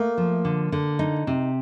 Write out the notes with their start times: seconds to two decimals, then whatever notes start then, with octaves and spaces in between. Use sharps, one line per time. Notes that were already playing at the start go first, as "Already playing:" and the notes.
Already playing: A3 A#3
0.18 F3
0.45 D3
0.72 D3
0.99 D#4
1.27 C3